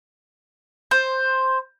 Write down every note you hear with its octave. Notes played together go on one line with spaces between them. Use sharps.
C5